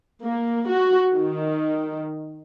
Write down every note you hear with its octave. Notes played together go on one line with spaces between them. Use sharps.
A#3
F#4
D#3